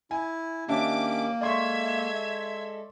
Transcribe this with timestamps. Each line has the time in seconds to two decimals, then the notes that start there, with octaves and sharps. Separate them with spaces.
0.11 E4 G#5
0.68 D#3 A#3 C#4 D4 G4 E5 D6
1.41 G#3 A4 D5 E5 C6 C#6 G#6